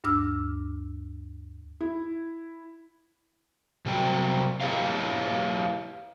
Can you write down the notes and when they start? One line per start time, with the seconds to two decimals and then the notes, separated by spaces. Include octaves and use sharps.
0.04 D2 G2 D4 D6 E6 F6
1.81 E4
3.86 C3 F#3 G3 G5
4.61 E4 G4 B4 C#5 D#5 F5